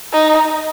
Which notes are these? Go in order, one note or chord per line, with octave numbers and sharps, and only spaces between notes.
D#4